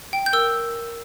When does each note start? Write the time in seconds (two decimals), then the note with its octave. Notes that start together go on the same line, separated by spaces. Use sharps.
0.13 G5
0.26 G6
0.33 A#4 E6